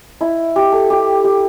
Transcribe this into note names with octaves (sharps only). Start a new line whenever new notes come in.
E4
G4
A4
G4
G4